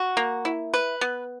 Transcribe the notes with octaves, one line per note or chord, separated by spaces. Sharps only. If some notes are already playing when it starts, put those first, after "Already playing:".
Already playing: F#4
A#3
E4
B4
B3